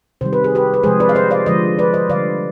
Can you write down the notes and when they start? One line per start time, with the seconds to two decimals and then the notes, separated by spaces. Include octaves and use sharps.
0.21 C3 D#3 G3 C5
0.33 B4
0.44 G#4
0.55 G4 B4
0.74 B4
0.83 C3 F3 G#3 G#4 C5
1.00 B4 D5
1.09 F5
1.15 C5 D#5
1.31 D5 F5
1.46 D3 F3 G#3 C5 D#5
1.79 B4 D5
1.94 C5 D#5
2.10 D3 G3 D5 F5